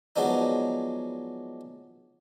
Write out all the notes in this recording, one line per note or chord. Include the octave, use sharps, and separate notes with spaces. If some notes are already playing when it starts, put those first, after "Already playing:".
F3 F#3 G#3 B3 D4 D#4